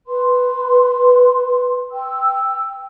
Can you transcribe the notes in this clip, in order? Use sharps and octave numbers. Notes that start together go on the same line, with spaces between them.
B4 C6
G5 E6